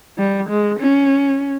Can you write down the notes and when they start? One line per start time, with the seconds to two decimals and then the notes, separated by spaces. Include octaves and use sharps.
0.18 G3
0.50 G#3
0.80 C#4